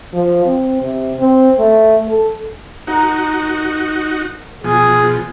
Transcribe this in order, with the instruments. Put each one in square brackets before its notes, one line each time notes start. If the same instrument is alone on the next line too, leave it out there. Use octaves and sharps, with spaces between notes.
[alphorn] F3
C4
C3
C4
A3
A4
[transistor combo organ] D#4 F#4 [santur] A#4 F#5 A#5
[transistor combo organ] B2 F3 [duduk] G#4 [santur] G#5